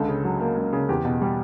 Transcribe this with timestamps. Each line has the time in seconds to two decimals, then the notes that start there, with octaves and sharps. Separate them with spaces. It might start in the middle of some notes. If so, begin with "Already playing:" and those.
Already playing: C#2 D3 A4
0.08 C#3
0.25 F#3
0.40 A#3
0.57 C#2
0.73 C#3
0.89 E2 G4
1.05 B2
1.21 G3